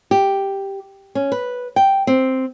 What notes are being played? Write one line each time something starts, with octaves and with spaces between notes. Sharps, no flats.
G4
C#4
B4
G5
C4